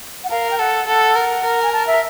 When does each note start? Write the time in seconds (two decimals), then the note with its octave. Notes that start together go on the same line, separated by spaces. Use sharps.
0.24 F#5
0.30 A#4 F5
0.51 G5
0.59 A4 F#5
0.87 A4 F#5
1.15 A#4
1.44 A#4
1.63 G#5
1.73 A5
1.87 E5